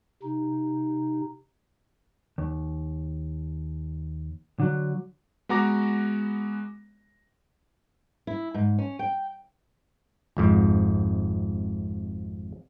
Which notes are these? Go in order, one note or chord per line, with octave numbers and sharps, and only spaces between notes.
C3 D#4
D#2
D3 F#3
G#3 B3 F#4 A#5 D6 A#6
E4
G#2
C#4
G5
G#1 F2 G#2